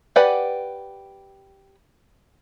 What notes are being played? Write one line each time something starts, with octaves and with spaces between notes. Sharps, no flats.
G4 B4 D5 F#5 G#5